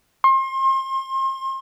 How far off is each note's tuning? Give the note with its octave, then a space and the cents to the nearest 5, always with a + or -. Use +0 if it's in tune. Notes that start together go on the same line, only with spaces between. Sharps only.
C6 +35